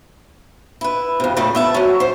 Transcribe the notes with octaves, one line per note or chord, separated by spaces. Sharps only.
E4 B4
F2 C3
A#2 C#3 G3 A3 D5
B3 E5 A5
F#3 C#4
C5